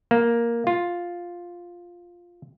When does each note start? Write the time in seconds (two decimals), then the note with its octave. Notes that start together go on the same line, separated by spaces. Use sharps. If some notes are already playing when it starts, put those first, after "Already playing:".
0.11 A#3
0.67 F4